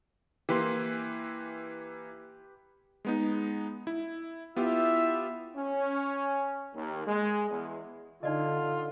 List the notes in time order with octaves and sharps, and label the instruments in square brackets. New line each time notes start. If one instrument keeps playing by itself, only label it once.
[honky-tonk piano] E3 A#3 [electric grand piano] G4 B4 C6
[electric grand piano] G#3 B3 D#4
E4
[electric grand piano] B3 F4 G4 [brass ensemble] E4 E5
[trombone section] C#4
D#2
G#3
E2
[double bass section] D3 [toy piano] D#4 D5 D#5 [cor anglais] F4